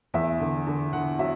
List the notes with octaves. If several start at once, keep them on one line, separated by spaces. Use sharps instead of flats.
E2 E5
D3
D3
D3 F#5
F#3 E5